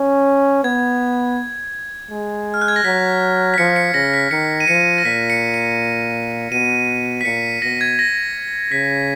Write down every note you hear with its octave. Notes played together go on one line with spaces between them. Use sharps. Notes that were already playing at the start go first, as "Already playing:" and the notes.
Already playing: C#4
B3 G#6
G#3
F6
F#6
G#6
A#6
F#3 B6
B6
F3 C#7
C#7
C#3 A#6
B6
D#3 C#7
D#7
F3 C#7
A#6
A#2 B6
C#7
C#7
B2 D#7
B6
A#2 C#7
B2 A#6
G#6
A#6
C#3 B6